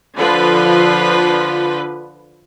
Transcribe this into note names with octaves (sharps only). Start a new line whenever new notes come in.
D3 F3 F4 B4